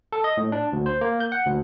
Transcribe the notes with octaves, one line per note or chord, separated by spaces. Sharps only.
A4
D#5
A2
D4
D2
C5
A#3
G6
F#5
D2